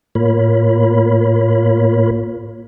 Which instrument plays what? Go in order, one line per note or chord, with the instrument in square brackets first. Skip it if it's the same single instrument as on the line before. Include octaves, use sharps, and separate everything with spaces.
[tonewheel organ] A2 A#3 F4 A#4 C#5 B5